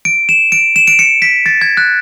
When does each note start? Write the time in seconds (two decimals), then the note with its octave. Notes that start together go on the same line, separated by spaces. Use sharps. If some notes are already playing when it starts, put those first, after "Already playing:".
0.05 D7
0.29 E7
0.52 D7
0.76 E7
0.87 D7
0.99 C#7
1.22 B6
1.46 A6
1.61 G#6
1.77 F#6